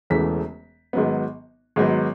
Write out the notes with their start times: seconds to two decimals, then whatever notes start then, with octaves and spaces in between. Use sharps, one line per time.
0.10 E1 E2 C#3 E3 A3 B6
0.93 G#1 G#2 F#3 B3
1.76 G#1 G#2 F#3 B3